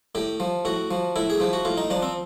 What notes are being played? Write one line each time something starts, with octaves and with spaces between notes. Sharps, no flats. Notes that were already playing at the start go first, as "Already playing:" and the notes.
A2 G4
F3
A2 F#4
F3
A2 E4
G#4
F3 G4
F#4
A2 F4
D#4
F3 D4
C4